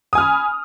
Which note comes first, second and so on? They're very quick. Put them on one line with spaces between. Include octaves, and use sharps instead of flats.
D#6 G#5 F6 B5